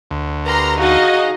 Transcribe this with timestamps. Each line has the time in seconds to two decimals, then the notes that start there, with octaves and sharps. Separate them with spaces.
0.11 D2
0.46 G4 A#4 B4 A#5 C6
0.79 D#4 F#4 G#4 D#5 F5